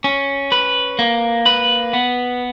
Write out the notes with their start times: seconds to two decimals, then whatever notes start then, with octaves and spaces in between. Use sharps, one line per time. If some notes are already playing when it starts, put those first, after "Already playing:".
0.04 C#4
0.52 B4
0.99 A#3
1.46 B4
1.93 B3